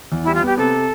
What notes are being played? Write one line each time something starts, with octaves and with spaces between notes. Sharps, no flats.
E2
G3 E4
F4
B3 G4
C3 A4